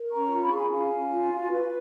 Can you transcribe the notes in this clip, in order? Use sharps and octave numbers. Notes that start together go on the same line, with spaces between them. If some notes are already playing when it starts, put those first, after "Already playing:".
Already playing: A#4
C#4 A#5 C#6
F4
B5
C#6
G#4 G#5 B5
C#4 F5 G#5
C#4
F4
F#4
B4